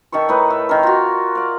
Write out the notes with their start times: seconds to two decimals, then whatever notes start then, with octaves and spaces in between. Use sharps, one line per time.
0.12 D#3 A4 E5 C#6
0.29 A2 D#4 B4
0.50 E5
0.69 D#3 A#4
0.83 F4 F#4
1.35 D5 F5